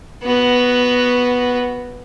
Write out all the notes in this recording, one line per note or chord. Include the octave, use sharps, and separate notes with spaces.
B3 F#4